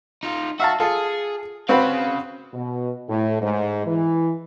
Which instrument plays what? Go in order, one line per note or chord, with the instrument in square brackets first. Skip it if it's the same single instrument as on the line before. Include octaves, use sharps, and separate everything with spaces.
[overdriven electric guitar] D#4 F4
[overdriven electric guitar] F#4 [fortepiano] E5 F5 A5
[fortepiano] F4 A4 [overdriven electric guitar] G#4
[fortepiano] C4 F#4 B4 [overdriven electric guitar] C#4 F5
[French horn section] B2
A2
G#2
E3